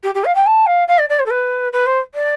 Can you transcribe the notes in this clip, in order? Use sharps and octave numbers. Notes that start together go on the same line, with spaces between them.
G4
G4
F5
G5
A5
F5
F5
D5
D5
C5
A4
B4
B4
C5
D5